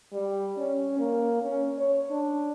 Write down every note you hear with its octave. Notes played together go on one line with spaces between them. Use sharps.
G3
C#4
A#3
C#4
C#5
D4